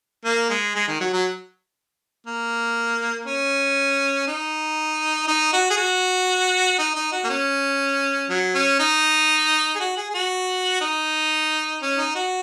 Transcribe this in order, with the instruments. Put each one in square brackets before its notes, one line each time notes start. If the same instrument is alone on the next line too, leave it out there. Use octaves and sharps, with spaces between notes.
[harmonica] A#3
G#3
G#3
D#3
F#3
F#3
A#3
C#4
D#4
D#4
F#4
G#4
F#4
D#4
D#4
F#4
A#3
C#4
F#3
C#4
D#4
G#4
F#4
G#4
G#4
F#4
D#4
C#4
D#4
F#4